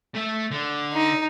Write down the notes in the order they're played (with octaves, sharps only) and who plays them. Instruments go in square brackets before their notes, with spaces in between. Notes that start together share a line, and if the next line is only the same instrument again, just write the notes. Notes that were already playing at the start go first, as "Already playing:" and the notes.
[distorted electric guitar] A3 E5
D3
[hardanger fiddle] D#4